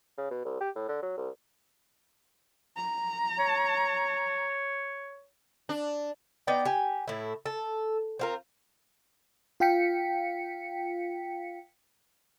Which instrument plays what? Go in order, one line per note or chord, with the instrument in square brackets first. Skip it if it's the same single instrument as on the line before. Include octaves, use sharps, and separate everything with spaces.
[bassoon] C#3
B2
C2
G4
A2
D3
F#3
C2
[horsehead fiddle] A#5
[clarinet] C#5
[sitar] D4
[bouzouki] B3 D#4 D5 G5
G4 G#5
A2 E4
A4
C4 F4 A#4
[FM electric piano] F4 F5 G5 B6 C#7